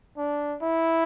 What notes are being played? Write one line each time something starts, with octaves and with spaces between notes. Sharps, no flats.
D4
E4